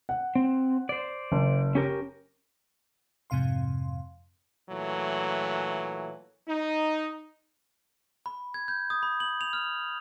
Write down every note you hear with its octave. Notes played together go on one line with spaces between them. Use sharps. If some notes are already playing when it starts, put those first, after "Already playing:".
F#5
C4
C5 D5
F#1
C#4 G4 A#4
F2 G#2 C3 F5 C6
A#2 E3 F#3 A3
D#4
B5
G#6
G6
D#6
B5
F#7
F7
F6